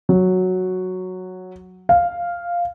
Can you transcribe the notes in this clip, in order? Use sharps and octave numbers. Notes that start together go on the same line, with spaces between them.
F#3
F5